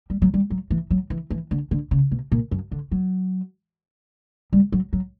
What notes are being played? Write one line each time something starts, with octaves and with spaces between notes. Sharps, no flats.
G3
F#3
G3
F#3
E3
F#3
E3
E3
D3
D3
C#3
B2
A#2
F#2
D3
F#3
G3
F#3
F#3